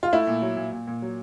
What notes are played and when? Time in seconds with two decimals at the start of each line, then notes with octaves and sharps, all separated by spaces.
0.03 F4
0.12 A3 E4
0.27 A#2
0.42 F#3
0.57 A#2
0.72 A#2
0.87 A#2
1.02 F#3